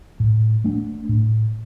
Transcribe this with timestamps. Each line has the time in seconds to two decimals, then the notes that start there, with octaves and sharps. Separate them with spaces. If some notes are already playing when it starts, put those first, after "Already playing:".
0.20 A2
0.64 A3 D4
1.09 A2